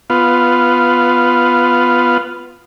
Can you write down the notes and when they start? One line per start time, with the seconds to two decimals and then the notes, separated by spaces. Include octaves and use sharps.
0.10 B3 F4